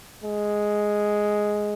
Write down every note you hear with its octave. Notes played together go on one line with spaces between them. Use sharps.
G#3